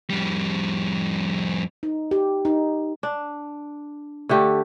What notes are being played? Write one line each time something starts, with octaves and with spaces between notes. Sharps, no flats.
F2 G3
D#4
G4
D#4
D4
D3 A3 G4